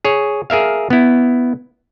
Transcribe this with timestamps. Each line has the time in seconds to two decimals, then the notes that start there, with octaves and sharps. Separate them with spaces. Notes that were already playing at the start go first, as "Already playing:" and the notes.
0.05 G#4 C#5
0.50 G#4 A#4 E5 F5
0.90 B3 E4